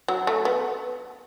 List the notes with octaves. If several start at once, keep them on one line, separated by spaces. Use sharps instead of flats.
F#3
A3
B3